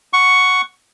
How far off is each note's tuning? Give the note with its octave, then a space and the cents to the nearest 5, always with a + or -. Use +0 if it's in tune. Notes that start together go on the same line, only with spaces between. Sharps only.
F#5 +0 C#6 +5